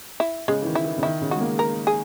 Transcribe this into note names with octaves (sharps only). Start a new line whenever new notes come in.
E4
C#3 G#3
E3
D#3
E4
E3
C#3
D#3 E4
C#3
G#3 F#4
A#3
A#4
G#4